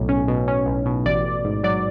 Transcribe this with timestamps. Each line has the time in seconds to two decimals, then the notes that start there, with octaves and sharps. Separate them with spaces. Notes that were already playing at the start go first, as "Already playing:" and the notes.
Already playing: B1 A2
0.09 C#4
0.28 B2
0.48 C#4
0.66 B1
0.86 B2
1.06 A1 D5
1.25 A1
1.45 G#2
1.64 F#3 D5